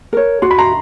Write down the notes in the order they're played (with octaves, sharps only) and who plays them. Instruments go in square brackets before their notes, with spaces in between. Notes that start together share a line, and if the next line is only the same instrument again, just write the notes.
[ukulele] A#4 C#5
[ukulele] F#4 [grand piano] C6
[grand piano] B5
A#5 C6